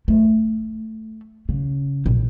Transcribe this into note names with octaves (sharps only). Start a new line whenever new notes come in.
A3
C#3
A#1